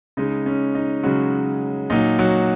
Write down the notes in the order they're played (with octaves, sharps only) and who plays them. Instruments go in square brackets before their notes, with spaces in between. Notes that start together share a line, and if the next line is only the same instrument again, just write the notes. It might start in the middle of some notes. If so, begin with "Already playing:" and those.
[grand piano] C#3 G#3 D#4
C#4
D#4
C#3 F#3 G#3 F#4
A#2 F#3 D#4
F#3 F#4